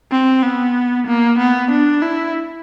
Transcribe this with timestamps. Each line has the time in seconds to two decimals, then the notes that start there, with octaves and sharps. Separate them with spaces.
0.11 C4
0.43 B3
1.07 A#3
1.38 B3
1.71 D4
2.02 E4